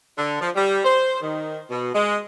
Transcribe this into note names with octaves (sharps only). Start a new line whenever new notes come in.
D3
F3
G3
C5
D#3
B2
G#3